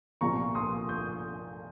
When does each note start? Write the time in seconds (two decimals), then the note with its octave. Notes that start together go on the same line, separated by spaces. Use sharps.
0.21 C2 A#2 F3 A#5 C#6
0.55 C6 D#6
0.89 D#6 G6